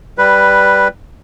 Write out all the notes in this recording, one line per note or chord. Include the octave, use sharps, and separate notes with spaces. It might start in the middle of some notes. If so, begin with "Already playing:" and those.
G3 B4